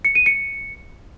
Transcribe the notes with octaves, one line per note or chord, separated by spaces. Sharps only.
C#7
D#7
C#7